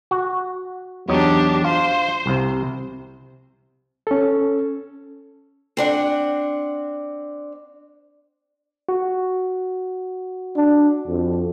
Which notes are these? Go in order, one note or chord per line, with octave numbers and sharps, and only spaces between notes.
F#4
E2 F#3 D4 D#4 G4
F4 C5
C2 C3
C#4 A4
C4 D4 F#5
F#4
D4
F2